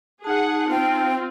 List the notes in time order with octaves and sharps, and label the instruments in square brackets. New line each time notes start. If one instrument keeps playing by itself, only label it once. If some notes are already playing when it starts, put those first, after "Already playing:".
[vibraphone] D#4 A5 [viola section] G#4 F#5
[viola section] C4 F4 [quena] G5